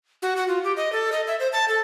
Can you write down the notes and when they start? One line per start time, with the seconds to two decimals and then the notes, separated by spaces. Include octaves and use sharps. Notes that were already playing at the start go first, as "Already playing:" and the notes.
0.22 F#4
0.36 F#4
0.48 F4
0.64 G4
0.76 D#5
0.93 A4
1.12 D#5
1.27 E5
1.40 C5
1.53 A5
1.68 A4